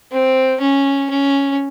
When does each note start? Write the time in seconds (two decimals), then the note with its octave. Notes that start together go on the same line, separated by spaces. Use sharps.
0.12 C4
0.61 C#4
1.10 C#4